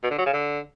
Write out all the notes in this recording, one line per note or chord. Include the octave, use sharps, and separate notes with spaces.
B2
D3
F#3
C#3
D3